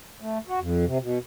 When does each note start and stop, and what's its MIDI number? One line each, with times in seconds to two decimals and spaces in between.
0.21 0.38 57
0.48 0.60 66
0.60 0.85 41
0.86 0.98 48
1.01 1.18 47